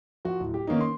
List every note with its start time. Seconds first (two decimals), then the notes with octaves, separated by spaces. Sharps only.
0.25 F3 F#4
0.40 D1
0.54 G4
0.67 D#3 A#3 B3 C#4 D#4
0.81 C6